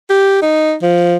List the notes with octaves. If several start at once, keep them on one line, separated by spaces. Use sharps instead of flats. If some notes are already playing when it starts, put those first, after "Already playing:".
G4
D#4
F3